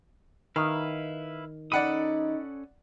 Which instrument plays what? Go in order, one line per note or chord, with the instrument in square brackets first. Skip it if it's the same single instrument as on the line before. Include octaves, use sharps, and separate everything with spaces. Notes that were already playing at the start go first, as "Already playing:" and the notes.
[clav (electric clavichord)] D#3 [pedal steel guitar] E4 B4 F5 [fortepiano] F6
[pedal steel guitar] C#4 A4 D#6 [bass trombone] D#4 [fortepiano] D5 F#5 B5